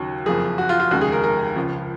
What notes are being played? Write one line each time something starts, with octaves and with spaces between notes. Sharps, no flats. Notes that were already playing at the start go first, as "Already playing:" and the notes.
Already playing: D#2 C#3 F#3
F#1 F2 F3 A#3 G#4
F#4
F4
F4
F1 D#2 C#3 G#3 F#4
G#4
A#4
A#4
C#2 C#3 F3